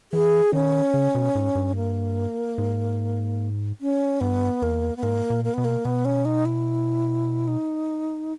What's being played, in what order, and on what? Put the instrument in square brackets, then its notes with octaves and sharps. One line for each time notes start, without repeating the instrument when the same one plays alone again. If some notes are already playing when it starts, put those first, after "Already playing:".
[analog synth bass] E3 [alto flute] G#4
[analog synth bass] D#3 [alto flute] C#4
[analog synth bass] C#3
B2
G#2
G2
[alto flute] A#3
[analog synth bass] G#2
[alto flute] C#4
[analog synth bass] G2 [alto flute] B3
[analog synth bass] E2 [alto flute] A#3
[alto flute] B3
[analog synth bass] G#2 [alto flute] A#3
[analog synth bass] A#2
[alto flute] A#3
[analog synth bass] B2 [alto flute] B3
[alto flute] A#3
[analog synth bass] B2 [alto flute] B3
[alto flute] C#4
D#4
E4
D#4